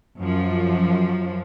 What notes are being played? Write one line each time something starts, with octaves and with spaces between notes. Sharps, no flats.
F#2 F3